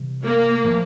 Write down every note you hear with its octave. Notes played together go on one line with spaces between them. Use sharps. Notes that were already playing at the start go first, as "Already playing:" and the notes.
Already playing: C3 E3 G3
A#3
A#2 F3 A3